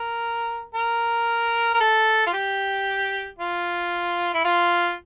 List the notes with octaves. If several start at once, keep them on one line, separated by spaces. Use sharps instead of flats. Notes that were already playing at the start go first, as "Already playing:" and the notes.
Already playing: A#4
A#4
A#4
A4
F4
G4
F4
E4
F4